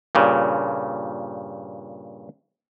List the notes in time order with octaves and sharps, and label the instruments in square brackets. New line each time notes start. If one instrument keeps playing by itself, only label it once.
[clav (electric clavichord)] G2 A#2 C#3